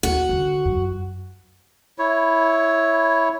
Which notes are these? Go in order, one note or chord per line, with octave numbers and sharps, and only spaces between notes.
D#2 F#4
D3
F#2
E4 C#5